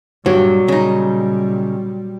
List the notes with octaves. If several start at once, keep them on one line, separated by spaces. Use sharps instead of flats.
G2 A#2 F#3 G3
C#3 D#4